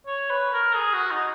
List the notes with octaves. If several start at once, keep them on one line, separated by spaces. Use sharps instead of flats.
C#5
B4
A#4
G#4
F#4
D#4